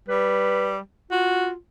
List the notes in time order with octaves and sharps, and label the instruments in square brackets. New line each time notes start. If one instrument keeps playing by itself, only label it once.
[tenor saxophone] G3 [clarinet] B4
[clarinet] F4 [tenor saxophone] F#4